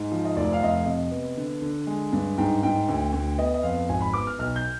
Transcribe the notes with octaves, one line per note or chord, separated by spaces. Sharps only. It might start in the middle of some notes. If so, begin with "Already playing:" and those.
Already playing: G#2
F3
D#5
F1 D5
F5
F2 D#5
F5
C3 D#5
B3
D3
D3
G#3
G2
G#2 G5
G#2 G5
D2
D2
B3 D#5
D#5
F2 F5
G#1 G#5
B5
B3 D6
F6
B1 F6
G6